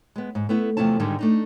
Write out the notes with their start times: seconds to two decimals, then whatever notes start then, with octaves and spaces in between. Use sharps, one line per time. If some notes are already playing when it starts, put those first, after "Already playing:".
0.16 G#3 B3
0.35 G#2
0.49 A3 B3 E4
0.77 E2 C3 F3 A3 E4 A5
1.00 G#2 D3 D#3 G3 G#3
1.19 A3 D4 D#4